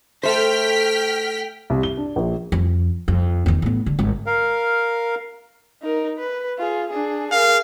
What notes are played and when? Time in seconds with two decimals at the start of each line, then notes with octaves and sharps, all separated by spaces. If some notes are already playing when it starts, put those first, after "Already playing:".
0.23 A3 C5 G5 F6 B6
1.70 C2
1.83 G7
1.97 D4
2.16 A#1
2.52 F2
3.08 F2
3.46 E2 D#3
3.62 A2 B3
3.86 D3
3.99 G#1
4.26 A#4 F5
5.82 D#4 A#4
6.19 B4
6.59 F4 G#4
6.90 D4 G#4
7.32 G#4 A#4 F5